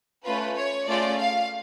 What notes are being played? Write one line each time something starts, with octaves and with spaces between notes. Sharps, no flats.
A3 C#4 F4 B4
C#5
A3 C#4 F4 G#4 D5
F5